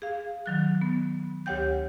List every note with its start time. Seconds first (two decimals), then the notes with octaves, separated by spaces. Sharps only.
0.02 G#4 F5
0.46 D#3 F#3 F#6
0.81 B3
1.46 D2 G4 C#5 F#5 G5 G6